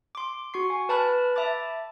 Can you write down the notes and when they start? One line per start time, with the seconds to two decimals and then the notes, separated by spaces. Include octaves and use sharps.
0.15 C6 D6
0.54 F#4 C#6 C7
0.70 G#5
0.89 B4 A5 B5 F6 F#6
1.36 E5 A5 B5 D6 A6